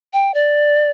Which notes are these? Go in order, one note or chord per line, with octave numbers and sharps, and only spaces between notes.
G5
D5